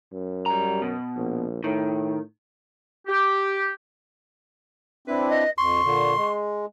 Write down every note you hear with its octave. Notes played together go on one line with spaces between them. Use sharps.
F#2
G3 A#5
B2
A#1
A2 D#3
G4
C4 D4 E4 B4
D#5
F2 C6 C#6
A#2 D3
G#3